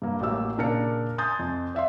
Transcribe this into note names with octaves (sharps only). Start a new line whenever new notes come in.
G2 A#3
A1 F#3 A#3 G4 E6
A#2 C#3 D4 A#4 D5 C#7
G#5 C6 D#6 G6 A6
F2
D5 E5 F5 C6